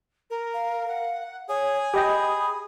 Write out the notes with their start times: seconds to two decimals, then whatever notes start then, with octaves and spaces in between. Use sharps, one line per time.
0.30 A#4
0.54 F5
0.88 F#5
1.49 G#4 C#5 D#6
1.94 G4 D#5 G5 B5